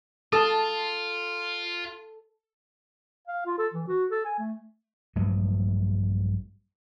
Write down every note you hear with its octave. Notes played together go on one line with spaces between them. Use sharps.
F4 A4 A5 D#6
F5
F4
A4
E3
F#4
A4
G#5
A3
A#1 G2 F#3 A3